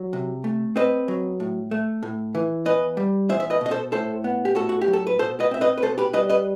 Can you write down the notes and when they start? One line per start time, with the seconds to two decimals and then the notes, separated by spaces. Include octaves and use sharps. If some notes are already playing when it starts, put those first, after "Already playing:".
Already playing: F#3
0.13 C3
0.44 A3
0.76 C4 B4 D#5
1.08 F#3
1.40 A2
1.71 A3
2.03 A2
2.35 E3
2.65 E2 B4 D#5
2.97 G3
3.29 E2 C5 E5
3.40 E5
3.50 B4 D#5
3.61 B2 D#5
3.71 A4 C5
3.92 A2 A4 C5
4.24 B3
4.45 G4
4.55 A2 F#4 A4
4.69 F#4
4.81 G4
4.88 F#3
4.93 A4
5.07 B4
5.19 B2 A4 C5
5.40 B4 D#5
5.51 C4 E5
5.61 B4 D#5
5.78 B4
5.82 B2 A4 C5
5.98 G4 B4
6.13 G3 B4 D#5
6.29 B4 D#5